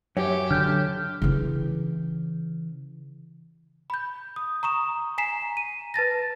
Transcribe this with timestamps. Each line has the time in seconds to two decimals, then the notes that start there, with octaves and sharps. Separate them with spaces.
0.17 F#2 G4 C#5 E5
0.51 D3 F6 G6
1.22 C#3 E3
3.90 B5 G6
4.36 D#6
4.63 A#5 C#6 D#6 E7
5.18 G#5 A#5 B6 C7 E7
5.57 D#7
5.94 B4 A5 A6 A#6